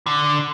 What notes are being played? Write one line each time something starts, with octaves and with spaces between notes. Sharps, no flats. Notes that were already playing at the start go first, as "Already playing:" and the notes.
D3